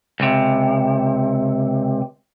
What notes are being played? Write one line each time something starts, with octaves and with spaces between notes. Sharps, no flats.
C#2 C3